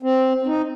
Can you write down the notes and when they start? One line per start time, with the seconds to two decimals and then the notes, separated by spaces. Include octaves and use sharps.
0.03 C4
0.42 C4
0.47 D#4